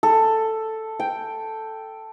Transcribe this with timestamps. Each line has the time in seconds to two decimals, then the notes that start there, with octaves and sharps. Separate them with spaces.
0.03 A4
1.00 G5